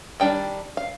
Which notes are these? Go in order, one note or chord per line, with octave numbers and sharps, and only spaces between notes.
D#3 G3 D4 G5
F5